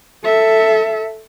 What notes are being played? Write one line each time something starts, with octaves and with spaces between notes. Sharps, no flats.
A4 E5